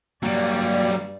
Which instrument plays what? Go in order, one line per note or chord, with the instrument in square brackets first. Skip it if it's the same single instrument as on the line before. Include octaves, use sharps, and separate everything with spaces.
[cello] G2 D5 [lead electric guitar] F#3 G3 [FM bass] A#3